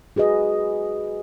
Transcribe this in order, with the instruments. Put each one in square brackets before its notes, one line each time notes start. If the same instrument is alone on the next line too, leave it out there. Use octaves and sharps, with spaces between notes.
[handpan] F#4 G#4 B4 D#5